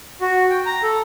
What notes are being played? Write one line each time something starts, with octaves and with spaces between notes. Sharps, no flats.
F#4
G5
A#5
A4